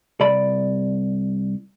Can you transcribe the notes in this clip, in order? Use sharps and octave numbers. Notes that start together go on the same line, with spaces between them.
C2 D5 B5